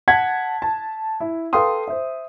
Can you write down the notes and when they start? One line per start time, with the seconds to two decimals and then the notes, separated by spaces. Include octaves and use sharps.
0.08 F#5 A5 G#6 B6
0.62 A5
1.20 E4
1.53 A4 B4 F5 G5 C6 D#6
1.88 C5 E5